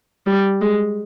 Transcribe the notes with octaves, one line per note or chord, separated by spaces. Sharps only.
G3
G#3